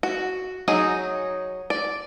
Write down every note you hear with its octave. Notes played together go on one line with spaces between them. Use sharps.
F#4
F#3 D#4 G#4
D5